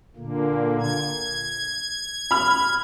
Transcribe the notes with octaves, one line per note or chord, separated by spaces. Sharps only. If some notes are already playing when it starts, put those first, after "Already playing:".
A#2 D3 A#3
G#6
B5 F6